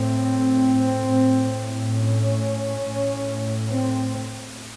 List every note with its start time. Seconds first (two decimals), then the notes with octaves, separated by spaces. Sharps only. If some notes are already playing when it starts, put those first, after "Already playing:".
Already playing: A2 C4
1.04 A2
1.93 C#4
2.81 A2
3.70 C4